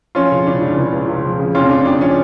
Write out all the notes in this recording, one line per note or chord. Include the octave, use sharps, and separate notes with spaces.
F3 C#4 F4
C#3
C#2 D4
C#2
C#2
C#2
C#2
F3
C#3
F2 C#4 F4
F2 D4
F2 D4
C#4